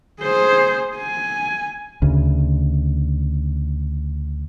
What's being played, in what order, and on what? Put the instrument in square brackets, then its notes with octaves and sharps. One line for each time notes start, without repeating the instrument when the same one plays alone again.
[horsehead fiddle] G#4 C5
G#5
[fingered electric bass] D2 C#3